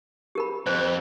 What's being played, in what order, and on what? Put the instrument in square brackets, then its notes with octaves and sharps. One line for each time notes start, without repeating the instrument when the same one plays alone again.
[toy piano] G4 A#4 B5
[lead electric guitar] F2 [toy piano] C5